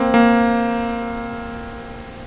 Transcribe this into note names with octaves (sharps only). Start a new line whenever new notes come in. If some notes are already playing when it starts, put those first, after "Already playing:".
Already playing: A#3 C4
A#3